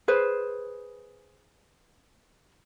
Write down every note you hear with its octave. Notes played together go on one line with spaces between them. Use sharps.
G#4 B4 C5